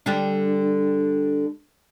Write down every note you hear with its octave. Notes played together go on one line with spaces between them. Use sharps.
D3 G3 D4